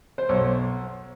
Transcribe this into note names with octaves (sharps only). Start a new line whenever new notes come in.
C5
B1 C#5